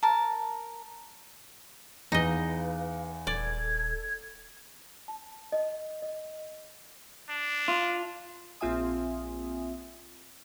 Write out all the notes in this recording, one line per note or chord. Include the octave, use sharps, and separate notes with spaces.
A#4 A5
E2 D#4 B4 D#5 F5
D#1 A4 D5 G#6
A5
D#5
D#5
D4
F4
A#1 C4 F4 E5 G#5 D#6